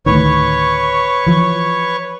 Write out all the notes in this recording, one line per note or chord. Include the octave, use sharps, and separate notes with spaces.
D2 A2 D#3 B4 C#5 C#6
E3 F3